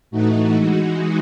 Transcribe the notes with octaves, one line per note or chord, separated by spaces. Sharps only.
A2 E3 A3 D#4 F#4
E3 G#3 D#4 F#4